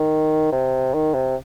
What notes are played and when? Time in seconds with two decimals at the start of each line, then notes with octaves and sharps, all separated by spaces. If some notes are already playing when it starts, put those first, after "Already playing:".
Already playing: D#3
0.52 C3
0.94 D#3
1.14 C3